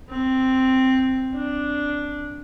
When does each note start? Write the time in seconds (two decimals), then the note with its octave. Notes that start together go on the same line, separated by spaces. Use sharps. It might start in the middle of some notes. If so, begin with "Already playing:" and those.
0.10 C4
1.35 D4